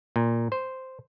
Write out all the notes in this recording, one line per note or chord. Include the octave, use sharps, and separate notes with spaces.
A#2
C5